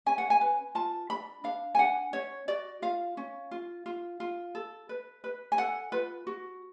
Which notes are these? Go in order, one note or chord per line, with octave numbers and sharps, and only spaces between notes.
C#4 G#5
F#5
G#5
B4
F4 A5
D4 B5
D4 F5
G#5
D4 F#5
C#4 C#5
F#4 D5
F4 F5
C#4
F4
F4
F4
A4
B4
B4
G#5
A4 F#5
F4 B4
F#4